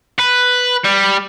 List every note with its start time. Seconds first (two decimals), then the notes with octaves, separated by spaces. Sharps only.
0.19 B4
0.84 G3